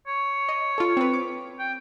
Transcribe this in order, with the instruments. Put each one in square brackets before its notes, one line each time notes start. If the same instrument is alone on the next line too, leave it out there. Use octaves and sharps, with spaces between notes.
[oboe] C#5
[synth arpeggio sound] D#5
F4 A4
C4 B4
D6
[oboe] G5